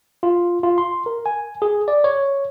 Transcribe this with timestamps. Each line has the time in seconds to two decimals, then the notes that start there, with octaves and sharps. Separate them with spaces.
0.23 F4
0.63 F4
0.78 C6
1.06 A#4
1.26 G#5
1.62 G#4
1.88 D5
2.04 C#5